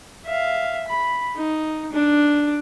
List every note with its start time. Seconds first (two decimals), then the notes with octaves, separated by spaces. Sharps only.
0.25 E5 F5
0.88 B5
1.35 D#4
1.93 D4